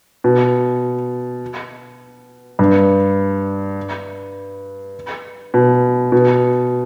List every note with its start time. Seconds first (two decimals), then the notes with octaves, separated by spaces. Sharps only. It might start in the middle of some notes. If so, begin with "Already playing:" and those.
0.24 B2
2.59 G2
5.54 B2
6.12 B2